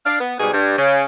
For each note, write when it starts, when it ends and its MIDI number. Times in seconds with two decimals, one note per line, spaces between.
0.06 0.17 62
0.06 0.17 77
0.21 0.35 59
0.40 0.53 44
0.40 0.53 47
0.40 0.53 55
0.40 0.53 68
0.54 0.76 43
0.78 1.06 49